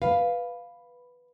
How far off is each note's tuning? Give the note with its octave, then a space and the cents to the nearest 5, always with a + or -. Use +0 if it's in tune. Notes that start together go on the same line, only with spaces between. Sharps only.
B4 +0 F5 +0